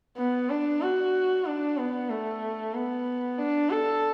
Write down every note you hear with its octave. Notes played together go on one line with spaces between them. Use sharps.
B3
D4
F#4
D4
B3
A3
B3
D4
A4